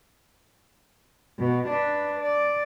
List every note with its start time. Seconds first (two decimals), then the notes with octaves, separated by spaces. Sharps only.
1.39 B2
1.68 D4 B4
2.19 D5